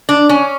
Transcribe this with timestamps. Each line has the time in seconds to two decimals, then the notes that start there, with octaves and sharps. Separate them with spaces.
0.09 D4
0.29 C#4